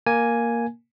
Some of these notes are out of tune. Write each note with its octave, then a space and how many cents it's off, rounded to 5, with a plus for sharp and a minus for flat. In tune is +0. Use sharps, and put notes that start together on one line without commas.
A#3 +0 A#4 +0 G#5 +0